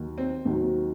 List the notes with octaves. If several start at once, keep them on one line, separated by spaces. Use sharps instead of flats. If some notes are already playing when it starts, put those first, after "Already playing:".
Already playing: D#2 D#3 F#3
C4
D#2 D#3 F#3